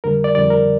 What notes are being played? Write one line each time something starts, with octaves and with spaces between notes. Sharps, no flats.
F2 D3 G3 A#4
D5
F2 D3 G3 D5
A#4